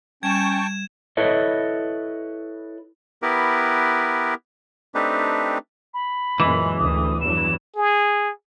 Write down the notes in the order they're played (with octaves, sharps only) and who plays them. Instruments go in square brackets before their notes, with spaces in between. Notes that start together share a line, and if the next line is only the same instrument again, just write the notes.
[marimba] G3 [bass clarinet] C#4 [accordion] G5 A5 C#6 [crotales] G#6 E7
[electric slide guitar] E4 A4 B4 C#5 D#5
[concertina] B3 E4 G4 A#4 B4
A3 C4 D4 D#4 G4 B4
[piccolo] B5
[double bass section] F#2 A#2 G#3 [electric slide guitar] E3
[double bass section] D2 [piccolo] D#6
[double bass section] E2 G2 F#3 [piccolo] E7
[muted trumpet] G#4